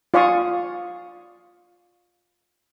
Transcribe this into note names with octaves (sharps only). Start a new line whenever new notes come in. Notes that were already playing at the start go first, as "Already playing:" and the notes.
F4 D5 F5 G#5 C#6 D#6